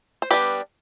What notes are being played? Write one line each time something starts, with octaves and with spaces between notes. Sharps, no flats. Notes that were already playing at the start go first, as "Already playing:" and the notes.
C5
G3 B3 D4 G4 B4